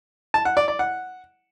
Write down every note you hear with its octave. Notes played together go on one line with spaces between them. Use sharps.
A5
F#5
D5
D5
F#5